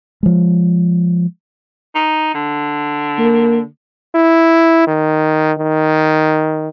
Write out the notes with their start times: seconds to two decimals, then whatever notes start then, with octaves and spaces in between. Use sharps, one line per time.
0.23 F3 G#3
1.95 D#4
2.35 D3
3.18 A#3
4.15 E4
4.87 D#3
5.58 D#3